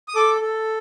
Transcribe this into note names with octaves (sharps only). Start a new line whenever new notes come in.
D#6
A4 D6
A4